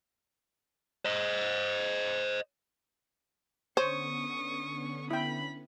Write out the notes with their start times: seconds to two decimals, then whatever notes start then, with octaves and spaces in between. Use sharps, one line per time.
1.05 C5 D#5
3.77 D3 B3 C#4 C5 C#5 C#6 D#6
5.11 E4 G5 B5